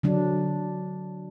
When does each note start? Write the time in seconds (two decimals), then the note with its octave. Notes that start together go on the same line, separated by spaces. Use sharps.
0.03 D3 F#3 D4